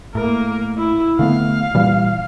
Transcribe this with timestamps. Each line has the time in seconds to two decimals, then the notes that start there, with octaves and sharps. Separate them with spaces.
0.15 A2 A#3 A#4
0.78 E4
1.19 D3 A3 B3 F5
1.75 A#2 E3 G3